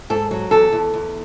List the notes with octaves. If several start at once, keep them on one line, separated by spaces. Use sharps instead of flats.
G#2 A4
F#3
E2 A4
E2
E2